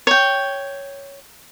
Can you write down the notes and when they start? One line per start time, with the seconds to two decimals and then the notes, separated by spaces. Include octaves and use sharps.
0.07 C#5 G5